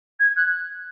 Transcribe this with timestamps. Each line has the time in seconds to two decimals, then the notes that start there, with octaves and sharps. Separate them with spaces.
0.19 G#6
0.36 F#6